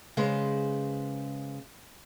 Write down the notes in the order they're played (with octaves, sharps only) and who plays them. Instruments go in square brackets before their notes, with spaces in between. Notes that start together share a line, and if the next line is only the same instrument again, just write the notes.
[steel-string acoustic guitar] C#3 G#3 B4 C5